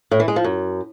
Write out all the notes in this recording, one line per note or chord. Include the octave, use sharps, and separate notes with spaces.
A2
E3
G#3
F3
F#2